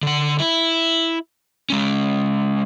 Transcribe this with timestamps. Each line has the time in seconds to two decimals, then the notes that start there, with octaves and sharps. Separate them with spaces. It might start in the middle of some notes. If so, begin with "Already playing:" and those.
0.03 D3 F#5
0.39 E4
1.70 G#3 C#4